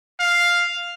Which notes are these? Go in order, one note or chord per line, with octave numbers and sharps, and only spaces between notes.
F5